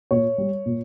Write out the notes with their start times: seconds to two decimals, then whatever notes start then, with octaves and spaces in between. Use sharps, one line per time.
0.11 A#2 C#5
0.38 G3
0.66 A#2